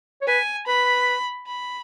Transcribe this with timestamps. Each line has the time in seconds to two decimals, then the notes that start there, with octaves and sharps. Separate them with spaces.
0.22 C#5
0.27 B4 G#5
0.67 B4 B5
1.48 B5